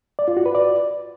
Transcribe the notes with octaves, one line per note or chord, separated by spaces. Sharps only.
D5
F4
F#4
B4
D5